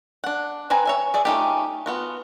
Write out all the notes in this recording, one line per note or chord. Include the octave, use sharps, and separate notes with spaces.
D4 F#5
C4 B4 G#5 A#5
C#5 E5 G#5
G#4 D5 E5
A3 C#4 D#4 F4 G4
B3 F4 F#4